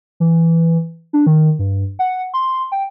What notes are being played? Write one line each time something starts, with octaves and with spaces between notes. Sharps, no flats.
E3
D4
D#3
G2
F#5
C6
G5